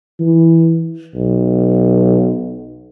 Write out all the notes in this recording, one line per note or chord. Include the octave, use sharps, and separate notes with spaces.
E3
B1